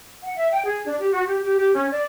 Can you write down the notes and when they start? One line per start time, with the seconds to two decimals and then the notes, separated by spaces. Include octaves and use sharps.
0.22 F#5
0.36 E5
0.51 G5
0.65 G#4
0.86 D4
0.99 G4
1.12 F#4
1.25 G4
1.43 G4
1.57 G4
1.75 C#4
1.91 D5